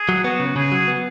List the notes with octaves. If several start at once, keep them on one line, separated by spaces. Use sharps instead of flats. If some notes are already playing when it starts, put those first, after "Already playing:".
Already playing: G#4
F#3
B3 F#4
C#3
C#3 G#4
F#3
B3